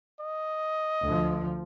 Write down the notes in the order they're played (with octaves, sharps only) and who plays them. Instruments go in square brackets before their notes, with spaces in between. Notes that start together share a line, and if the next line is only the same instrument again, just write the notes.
[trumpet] D#5
[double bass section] D2 F3